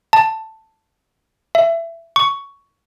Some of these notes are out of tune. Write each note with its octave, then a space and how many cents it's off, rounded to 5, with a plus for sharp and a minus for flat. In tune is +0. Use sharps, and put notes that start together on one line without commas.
A5 +5
E5 +20
C#6 +10